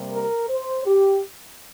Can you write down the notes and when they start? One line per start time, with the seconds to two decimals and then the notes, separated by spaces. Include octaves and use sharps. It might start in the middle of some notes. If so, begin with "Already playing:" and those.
Already playing: C3 G3 A#3
0.12 A#4
0.49 C5
0.86 G4